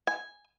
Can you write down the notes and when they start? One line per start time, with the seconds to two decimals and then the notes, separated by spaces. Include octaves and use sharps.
0.07 G#5